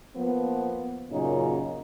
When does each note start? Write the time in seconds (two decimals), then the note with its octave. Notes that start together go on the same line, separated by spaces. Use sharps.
0.16 F3 A#3 B3
1.11 F#2 A#2 C#3 D#4